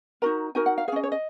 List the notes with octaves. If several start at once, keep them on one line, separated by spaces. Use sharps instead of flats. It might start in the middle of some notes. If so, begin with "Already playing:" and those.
D#4 F#4 A#4 A#5
D#4 F#4 A#4 G#5
F#5
F5
C#4 G#4 D#5 F5
C#5
D#5